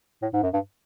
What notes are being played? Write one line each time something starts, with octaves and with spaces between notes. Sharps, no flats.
A2
G#2
F#2
G2